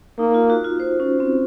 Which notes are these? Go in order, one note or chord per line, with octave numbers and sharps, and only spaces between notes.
A#3 D#4
F4
F#4
F4
C5
C#4
C4